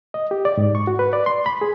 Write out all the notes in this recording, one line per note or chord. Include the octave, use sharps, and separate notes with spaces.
D#5
G4
D5
G#2
C#6
F#4
B4
D5
C6
B5
G#4